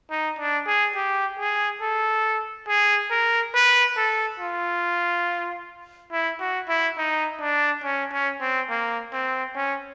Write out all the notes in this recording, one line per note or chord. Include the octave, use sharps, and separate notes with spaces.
D#4
D4
G#4
G4
G#4
A4
G#4
A#4
B4
A4
F4
E4
F#4
E4
D#4
D4
C#4
C#4
C4
A#3
C4
C#4